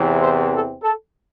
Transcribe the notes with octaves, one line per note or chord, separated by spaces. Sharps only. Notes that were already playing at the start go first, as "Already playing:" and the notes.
Already playing: E2 C3 E3 C4
C5
A4
A4